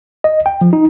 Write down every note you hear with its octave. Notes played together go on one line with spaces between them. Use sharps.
D#5
G5
F3
D#4